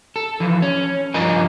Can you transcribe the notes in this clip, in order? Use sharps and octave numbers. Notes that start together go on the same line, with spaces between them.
A4
E3 F3
C#4
G2 F3 F4 A#4 D#5 G#5